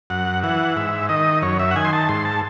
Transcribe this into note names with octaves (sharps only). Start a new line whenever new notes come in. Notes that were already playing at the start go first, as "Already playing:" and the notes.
F#2 F#5
E3 F#5
G#2 E5
D#3 D#5
F#2 C#5
E5
F#5
D#3 G#5
C6
A5
G#2 C6
A5